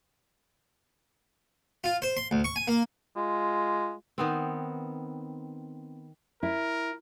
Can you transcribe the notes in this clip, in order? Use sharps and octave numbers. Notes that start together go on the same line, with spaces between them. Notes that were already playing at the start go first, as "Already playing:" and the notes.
F4
C5
C6
D2
C#6
G#5
A#3
G#3 F4
D#3 B3 C4
E4 A#4